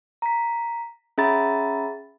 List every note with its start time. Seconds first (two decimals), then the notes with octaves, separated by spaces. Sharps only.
0.22 A#5 B6
1.18 C#4 G#4 E5 A#5 B5 A6